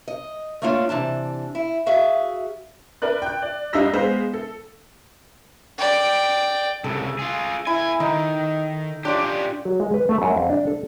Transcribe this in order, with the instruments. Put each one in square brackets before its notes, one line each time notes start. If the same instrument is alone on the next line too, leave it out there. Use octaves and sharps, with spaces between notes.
[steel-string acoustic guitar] D#5
A3 A#3 C#4 D4 F4
C3 E3 D4 A5
E4
F#4 G#4 E5 F5
[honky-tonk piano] A#4 B4 D5 F#6
G5 F#6
D5
G2 G3 D#4 F5 E6 A#6
G#3 B3 C5 F5
A4
[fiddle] D5 G5
[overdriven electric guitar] C2 C#3 [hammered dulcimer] A4
[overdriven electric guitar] F4 G#4
[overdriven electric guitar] B3 G#5 [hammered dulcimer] E4
[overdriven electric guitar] D#3 [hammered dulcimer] D#4
[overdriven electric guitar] C#4 G4 [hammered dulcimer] D4 F4 D5
[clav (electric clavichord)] F#3
G#3
B4
A3
F#2
F2
D4
A4